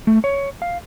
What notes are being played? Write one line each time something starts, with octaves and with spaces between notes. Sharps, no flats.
A3
C#5
F5